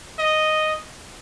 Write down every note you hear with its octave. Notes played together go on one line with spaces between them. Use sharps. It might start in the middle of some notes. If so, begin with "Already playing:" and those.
D#5